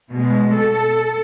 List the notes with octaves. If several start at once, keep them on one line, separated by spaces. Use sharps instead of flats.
B2 G#3
A4